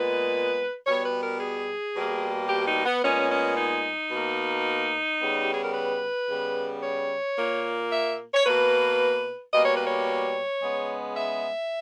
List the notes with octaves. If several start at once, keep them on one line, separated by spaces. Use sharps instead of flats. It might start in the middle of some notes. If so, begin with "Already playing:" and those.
Already playing: A#2 G#3 B3 B4
B2 G3 B3 C#5
B4
A#4
G#4
B2 G3 A#3
G4
D#4
B3
A#2 G#3 B3 C#4
C#4
D#4
B2 A#3
C#3 G3 B3
G4
G#4
A#4
B4
C#3 G3 B3
C#5
A#2 A#3
E5
C#5
B2 A#3 B4
B2 G3 A#3 D#5
C#5
B4
C#5
C#3 G#3 B3
E5